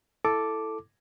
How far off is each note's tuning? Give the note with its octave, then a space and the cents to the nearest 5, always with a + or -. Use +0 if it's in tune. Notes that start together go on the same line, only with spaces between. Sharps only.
E4 +0 A4 +0 D6 +0